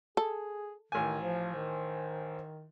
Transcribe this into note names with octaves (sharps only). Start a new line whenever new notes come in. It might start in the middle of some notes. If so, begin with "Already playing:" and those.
G#4 A4
A1 D#3 G#5
F3 C5
D#3